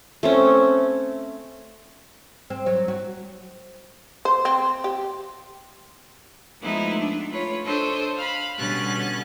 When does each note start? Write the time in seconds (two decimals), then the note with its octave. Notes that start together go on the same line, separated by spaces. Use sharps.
0.23 A3 C4 C#4
2.50 C4
2.66 F#3
2.88 F#4
4.25 C5
4.45 C4
4.84 G4
6.61 F3 G#3 A3 B3 D#4 E4
6.99 D4
7.31 A3 F4 B4 C#5
7.65 D4 A4 C5 C#5 D#5
8.16 F5 B5
8.58 B2 D3 G3 C#4 F#6 A6